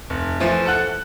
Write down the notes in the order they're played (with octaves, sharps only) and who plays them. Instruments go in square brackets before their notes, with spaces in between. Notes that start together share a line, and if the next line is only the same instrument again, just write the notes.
[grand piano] F1
E3 F3 A3 F4
A4 F#5 F#6